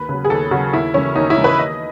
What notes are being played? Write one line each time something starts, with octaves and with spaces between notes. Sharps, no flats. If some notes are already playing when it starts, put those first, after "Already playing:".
Already playing: D#2 B4
C#3 F#3
G#4
D#2 A4
C#3 F#3 F#4
D#2 E4
C#3 E3 C#4
D#2 D#4
E4
C#3 E3
B4
D#2 D#5